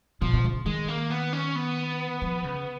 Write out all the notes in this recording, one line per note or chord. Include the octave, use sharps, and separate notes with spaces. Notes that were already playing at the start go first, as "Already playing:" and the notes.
B2 F3
B2
C#3
D#3 G#3
A#3
B3
C#4
B3
F3
C#3